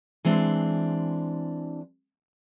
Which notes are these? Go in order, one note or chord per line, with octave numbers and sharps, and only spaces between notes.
E3 G#3 C4 D4